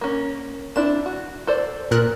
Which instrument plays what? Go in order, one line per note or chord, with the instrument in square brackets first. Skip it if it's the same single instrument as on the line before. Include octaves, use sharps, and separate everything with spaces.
[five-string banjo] A#3 C#4
[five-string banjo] C4 D4 E4 [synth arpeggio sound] E7
[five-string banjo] F#4
A4 C5 D5
[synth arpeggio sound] A#2 A#4 F#6